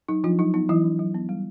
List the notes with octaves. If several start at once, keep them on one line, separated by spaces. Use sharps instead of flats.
F#3 D#4
F3 D4 F4
F#3 D#4
B3 D#4
E3 F#3 E4
D4
F#3
B3
G3